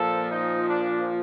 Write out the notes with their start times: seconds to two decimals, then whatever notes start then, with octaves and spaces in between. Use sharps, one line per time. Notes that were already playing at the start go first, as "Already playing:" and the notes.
Already playing: A#2 F3 A4
0.31 D#4
0.68 D4